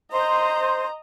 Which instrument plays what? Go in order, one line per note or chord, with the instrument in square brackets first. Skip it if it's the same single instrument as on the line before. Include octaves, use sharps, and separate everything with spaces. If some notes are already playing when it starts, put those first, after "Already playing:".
[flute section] C5 C6 [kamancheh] D#5 A#5